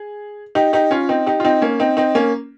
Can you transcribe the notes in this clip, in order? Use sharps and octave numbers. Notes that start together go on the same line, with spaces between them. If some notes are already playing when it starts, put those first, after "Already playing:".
Already playing: G#4
D#4 G4
D#4 G4
C#4 F4
C4 D#4
D#4 G4
F4
C4 D#4
A#3 C#4
C4 D#4
C4 D#4
A#3 C#4